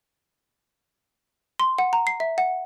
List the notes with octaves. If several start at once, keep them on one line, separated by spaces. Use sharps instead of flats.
C6
F#5
A#5
C7
E5
F#5